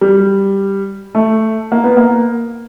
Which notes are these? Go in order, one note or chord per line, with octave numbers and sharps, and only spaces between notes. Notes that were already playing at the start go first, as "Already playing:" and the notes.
G3
A3
A#3
B3
A#3